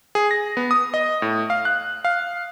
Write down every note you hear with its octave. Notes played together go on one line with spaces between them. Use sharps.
G#4
A#6
B3
D#6
D#5
A2
F5
F#6
F5